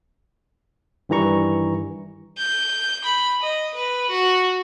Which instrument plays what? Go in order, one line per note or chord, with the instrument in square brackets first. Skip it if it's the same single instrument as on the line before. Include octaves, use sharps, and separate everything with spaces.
[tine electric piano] G2 D#3 E3 G3 A#5 C#6
[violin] G6
B5
D#5
B4
F#4